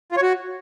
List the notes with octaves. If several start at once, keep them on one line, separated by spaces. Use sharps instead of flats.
F4
C#5
F#4